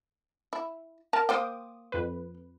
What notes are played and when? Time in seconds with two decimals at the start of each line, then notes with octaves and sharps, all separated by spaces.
0.53 E4
1.13 A#4 A5
1.29 A#3 C5 G5 D6 D#6
1.92 F2 B4